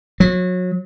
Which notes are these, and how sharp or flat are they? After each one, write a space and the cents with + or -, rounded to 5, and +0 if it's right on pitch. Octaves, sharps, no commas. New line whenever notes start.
F#3 -30